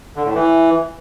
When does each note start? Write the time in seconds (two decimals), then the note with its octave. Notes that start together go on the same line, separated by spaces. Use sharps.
0.16 D3
0.25 A2
0.34 E3